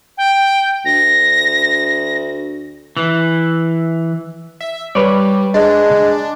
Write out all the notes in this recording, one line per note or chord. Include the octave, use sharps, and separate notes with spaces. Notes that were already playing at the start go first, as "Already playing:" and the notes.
G5
D2 A#6
E3
E5
G3 B4 C#5 D5
G#3 D4